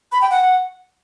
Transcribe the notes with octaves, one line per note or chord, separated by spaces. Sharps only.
B5
G5
F#5